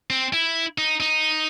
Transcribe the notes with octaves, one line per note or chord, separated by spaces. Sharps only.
C4
E4
D#4
D#4